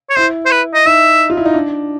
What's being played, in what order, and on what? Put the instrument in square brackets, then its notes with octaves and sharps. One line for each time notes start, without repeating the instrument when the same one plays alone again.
[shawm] C#5
[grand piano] E4 [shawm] C5
[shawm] C5
B4
D#5
[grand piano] D#4 [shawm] E5
[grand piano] F4
E4
D#4
D4